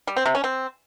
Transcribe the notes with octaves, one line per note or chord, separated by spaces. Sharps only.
G3
C4
C3
C#4
C4